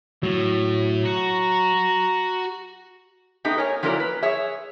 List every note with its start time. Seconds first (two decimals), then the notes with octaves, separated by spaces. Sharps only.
0.23 A2 F#3
1.05 F#4 A#5
3.45 A3 B3 D#4 G4
3.58 A#4 C#5 G#5
3.83 F3 F#3 A#3 E4 A#4 D5
4.00 B4
4.23 G#4 C#5 E5